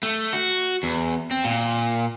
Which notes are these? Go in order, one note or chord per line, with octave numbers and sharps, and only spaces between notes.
A3
F#4
E2
C4
A#2